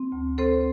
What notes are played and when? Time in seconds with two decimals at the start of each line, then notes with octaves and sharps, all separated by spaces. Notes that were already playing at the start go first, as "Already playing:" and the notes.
Already playing: C4
0.12 D2
0.38 C4 A4 C5